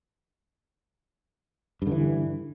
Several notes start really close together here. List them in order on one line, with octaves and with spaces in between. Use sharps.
G2 D3 E3